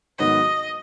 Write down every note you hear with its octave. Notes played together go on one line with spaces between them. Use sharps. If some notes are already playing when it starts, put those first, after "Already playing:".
G#2 D#3 F#3 B3 F#4 D#5